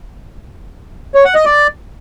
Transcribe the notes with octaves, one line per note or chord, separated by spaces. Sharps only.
C#5
F#5
D#5
D5